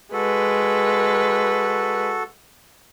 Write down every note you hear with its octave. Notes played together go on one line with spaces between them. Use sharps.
G#3 F#4 A4 B4